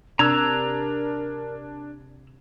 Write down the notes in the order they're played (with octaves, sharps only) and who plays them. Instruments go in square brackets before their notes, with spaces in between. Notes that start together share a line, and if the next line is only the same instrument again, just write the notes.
[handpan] C3 [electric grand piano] D4 G#6 [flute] A#4 [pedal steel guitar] A#5 E6 F#6